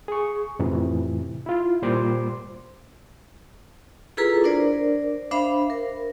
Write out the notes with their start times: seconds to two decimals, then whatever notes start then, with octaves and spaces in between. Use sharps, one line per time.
0.08 G#4 C#6
0.59 F2 A2 C3 E3
1.46 E4 F4
1.82 A#2 G3 C5 C6 D6
4.17 E4 F4 G#4 A4 B4 A#5
4.44 D4 A#4 C5 D5
5.31 D4 C5 E5 F5 B5
5.70 A#4